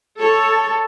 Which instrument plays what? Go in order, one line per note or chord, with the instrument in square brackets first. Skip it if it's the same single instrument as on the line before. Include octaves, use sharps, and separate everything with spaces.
[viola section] A4 [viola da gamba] C#5